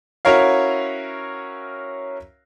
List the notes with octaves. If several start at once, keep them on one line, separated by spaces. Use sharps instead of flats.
C#4 E4 F#4 A#4 C#5 F5